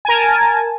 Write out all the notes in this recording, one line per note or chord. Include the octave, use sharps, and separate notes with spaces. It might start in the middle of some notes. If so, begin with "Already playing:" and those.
A#4 G#5 A5